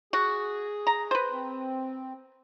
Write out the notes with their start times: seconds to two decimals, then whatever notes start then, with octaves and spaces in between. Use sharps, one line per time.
0.13 F#4 G#4
0.87 A#5
1.11 B4 C5
1.31 C4